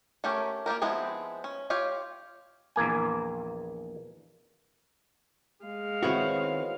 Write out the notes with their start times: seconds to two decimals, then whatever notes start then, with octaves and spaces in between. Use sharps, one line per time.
0.24 A3 C#4 G4 A#4
0.66 A#3 F4 G4 A#4
0.82 F3 G#3 B3 C4 E4
1.44 C#4
1.70 F4 G4 C#5 F5
2.76 A#1 E2 A#3 G#5
5.65 G#3 F5
6.03 D#3 B3 C4 E4 F#4 C#5